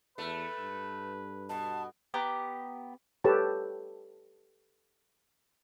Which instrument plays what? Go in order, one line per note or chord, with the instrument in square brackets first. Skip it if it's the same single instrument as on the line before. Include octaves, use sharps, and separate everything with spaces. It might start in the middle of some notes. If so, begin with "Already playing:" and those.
[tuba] E2 [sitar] A3 [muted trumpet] B4
[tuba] G2
[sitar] B2 [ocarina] A5
[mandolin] B3 G4 A#5 D6
[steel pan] G4 A4 B4 C#5 A5